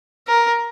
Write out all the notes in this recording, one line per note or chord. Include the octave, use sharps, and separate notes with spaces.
A#4